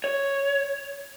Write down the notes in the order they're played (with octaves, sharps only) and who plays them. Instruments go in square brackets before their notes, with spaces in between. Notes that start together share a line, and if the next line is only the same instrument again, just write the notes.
[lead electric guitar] C#5